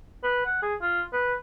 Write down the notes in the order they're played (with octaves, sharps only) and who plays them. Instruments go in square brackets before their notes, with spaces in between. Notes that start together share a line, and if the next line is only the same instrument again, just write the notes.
[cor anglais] B4
F#5
G#4
F4
B4